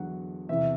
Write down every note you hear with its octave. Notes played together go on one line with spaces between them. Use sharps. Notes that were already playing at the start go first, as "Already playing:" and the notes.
Already playing: E2 D3 F#3 F#5
E2 C3 E3 E5